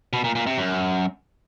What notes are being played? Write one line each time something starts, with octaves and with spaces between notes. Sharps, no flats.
B2
A#2
A#2
C3
F#2